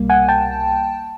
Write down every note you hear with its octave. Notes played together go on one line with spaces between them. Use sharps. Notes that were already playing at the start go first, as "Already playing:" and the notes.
Already playing: C2 B2 G3 A#3
F#5 G#5
G5 A5